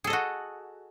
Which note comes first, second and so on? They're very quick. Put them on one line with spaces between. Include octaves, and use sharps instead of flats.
G#4 A4 D#5 F#4